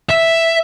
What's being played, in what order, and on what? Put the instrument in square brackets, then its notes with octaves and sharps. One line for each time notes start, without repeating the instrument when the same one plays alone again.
[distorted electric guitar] E5